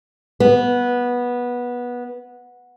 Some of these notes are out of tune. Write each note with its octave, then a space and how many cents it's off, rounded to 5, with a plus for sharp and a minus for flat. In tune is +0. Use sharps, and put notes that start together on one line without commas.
B3 -15